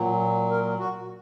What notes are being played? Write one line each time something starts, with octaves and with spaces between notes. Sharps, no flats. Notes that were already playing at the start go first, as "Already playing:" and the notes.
Already playing: A#2 F#3
A#4
F#4